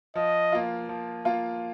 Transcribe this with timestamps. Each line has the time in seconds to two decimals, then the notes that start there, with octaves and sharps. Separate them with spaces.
0.15 F3 D#5
0.52 A#3 F4
0.89 F3
1.25 A#3 F4